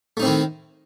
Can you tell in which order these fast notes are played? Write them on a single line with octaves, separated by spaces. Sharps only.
A3 D#4 C4 E4 D#3